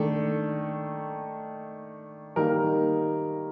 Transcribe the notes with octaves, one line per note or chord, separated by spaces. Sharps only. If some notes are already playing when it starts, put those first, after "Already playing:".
Already playing: D#3 A3 D4 A4
D#3 G3 A#3 D#4 A#4